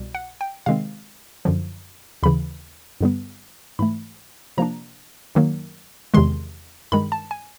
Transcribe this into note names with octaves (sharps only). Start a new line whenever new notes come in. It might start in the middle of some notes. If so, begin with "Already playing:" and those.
Already playing: C2 B2 G3
F#5
G5
C3 D#3 G#3 C4 F5
F#2 D3 F3
D#2 C#3 E3 B5
G2 D3 G3 B3
G#2 E3 A3 B5
C3 F3 A#3 D4 A#5
F#2 D#3 F#3 A#3
E2 C3 D#3 G#3 C6
G2 D#3 G#3 B5
A5
G#5